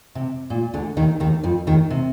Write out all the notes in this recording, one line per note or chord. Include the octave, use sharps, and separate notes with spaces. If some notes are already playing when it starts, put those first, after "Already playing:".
C3
A#2
D2 D3
D#2 D#3
D#2 D#3
F2 F3
D#2 D#3
C3